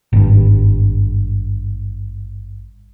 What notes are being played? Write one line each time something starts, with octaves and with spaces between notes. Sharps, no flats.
G#1 G2